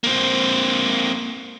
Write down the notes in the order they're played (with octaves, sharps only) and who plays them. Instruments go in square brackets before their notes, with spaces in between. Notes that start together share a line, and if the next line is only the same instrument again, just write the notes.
[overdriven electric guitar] A#3 C4